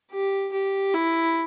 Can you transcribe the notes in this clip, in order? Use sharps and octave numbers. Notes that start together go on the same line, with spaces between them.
G4
G4
E4